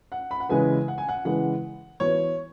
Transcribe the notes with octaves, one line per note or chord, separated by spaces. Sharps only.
F#5
B5
F#5
C#3 E3 G#3 E4 B4 G#5
F#5
G#5
F#5
C#3 E3 G#3 E4 B4 F#5
E3 B3 F#4 B4 C#5